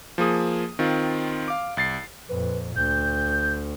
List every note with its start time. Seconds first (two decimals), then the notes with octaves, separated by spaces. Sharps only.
0.18 F3 A#3 G#4 D#6
0.79 D#3 C4 F4
1.48 F5 D6
1.77 C2 A6 C7
2.29 F2 A#2 B4
2.76 D2 G6